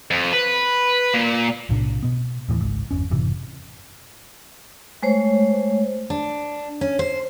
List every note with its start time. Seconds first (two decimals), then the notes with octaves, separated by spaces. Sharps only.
0.11 F2
0.33 B4
1.14 A#2
1.69 B1 A2 C3 D4
2.03 B2 B3
2.49 D#2 A2 D#3 E3
2.61 G#1 C#2 G#2
2.91 G1 E2 C#4
3.10 F#1 A2 C3 E3
5.02 G#3 A3 C5 C#5
6.10 D4
6.81 C#4
6.99 C5